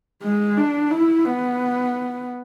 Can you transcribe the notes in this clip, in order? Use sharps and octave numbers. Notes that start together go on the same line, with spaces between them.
G#3
D4
E4
B3